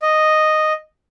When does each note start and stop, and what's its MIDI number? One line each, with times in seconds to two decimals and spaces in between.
0.02 0.73 75